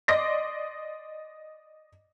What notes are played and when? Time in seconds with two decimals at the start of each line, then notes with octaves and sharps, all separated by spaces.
0.08 D5 D#5 C6 D6 A#6